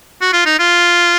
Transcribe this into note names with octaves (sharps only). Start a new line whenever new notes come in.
F#4
F4
D#4
F4